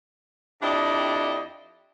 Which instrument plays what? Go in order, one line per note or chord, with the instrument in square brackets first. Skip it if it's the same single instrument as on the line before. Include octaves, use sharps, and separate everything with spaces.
[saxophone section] F2 D4 E4 G4 D5 D#5